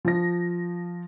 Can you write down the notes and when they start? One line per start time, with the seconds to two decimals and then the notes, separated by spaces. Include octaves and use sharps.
0.05 F3 A#6